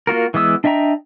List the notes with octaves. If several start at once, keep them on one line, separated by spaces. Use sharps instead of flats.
A#3 F4 F#4 A#4
E3 G#3 B3 D#6 E6
D4 D#5 E5 G5 A#5